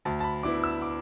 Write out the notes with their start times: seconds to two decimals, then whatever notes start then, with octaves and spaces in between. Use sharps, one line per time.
0.05 D2 A5
0.20 A5
0.24 B5
0.43 D3 B3 E4 D6
0.64 E6
0.82 D6